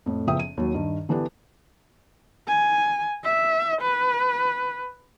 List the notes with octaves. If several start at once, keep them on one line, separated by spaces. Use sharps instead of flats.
F2 A2
F#1 F3 B3 E5 G5 D#6
D#7
D#2 F#3
G2 D#3
D3 E3 B3 D4 G4
G#5
E5
B4